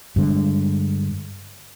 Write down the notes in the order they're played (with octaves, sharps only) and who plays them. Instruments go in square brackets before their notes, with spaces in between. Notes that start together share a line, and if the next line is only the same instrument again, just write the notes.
[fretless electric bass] G2 D3 G#3